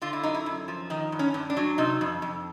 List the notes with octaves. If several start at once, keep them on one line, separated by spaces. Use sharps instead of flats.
D3 F4
E4
F#2 D#4
E4
F#2
F3
D#3 D#4
G2
C#4
G2
D4
F#3
C3 D#4
F2
F2